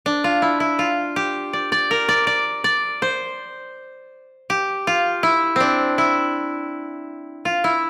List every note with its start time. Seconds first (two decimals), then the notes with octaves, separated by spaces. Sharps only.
0.06 D4
0.24 F4
0.42 E4
0.60 E4
0.79 F4
1.16 G4
1.53 D5
1.72 D5
1.91 A#4
2.09 D5
2.27 D5
2.64 D5
3.02 C5
4.50 G4
4.87 F4
5.23 E4
5.56 C4 D4
5.98 E4
7.45 F4
7.64 E4